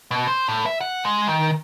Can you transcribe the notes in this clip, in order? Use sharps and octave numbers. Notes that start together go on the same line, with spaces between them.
B2
C5
A2
E5
F#5
G#3
D#3